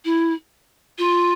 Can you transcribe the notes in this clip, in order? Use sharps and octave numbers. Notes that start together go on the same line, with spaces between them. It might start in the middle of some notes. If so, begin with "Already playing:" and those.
E4
F4